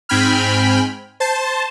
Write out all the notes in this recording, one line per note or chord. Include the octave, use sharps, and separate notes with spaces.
G#2 C4 G5 G#5 B5 F6
C5 A5